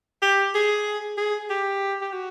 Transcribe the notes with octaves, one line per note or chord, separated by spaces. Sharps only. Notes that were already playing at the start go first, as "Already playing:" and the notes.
G4
G#4
G#4
G4
G4
F#4